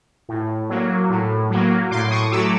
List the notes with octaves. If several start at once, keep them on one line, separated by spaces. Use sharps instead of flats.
A2
F#3 A#3
A2
F#3 A#3
A2 C6 D6
C#6 D#6
F#3 A3 D6 E6